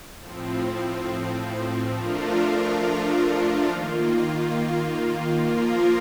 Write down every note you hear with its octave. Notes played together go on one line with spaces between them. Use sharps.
A2 F3 C4
F3 A3 D4 F4 A#4
D#3 A#3 F4
F3 A#3 F4 A#4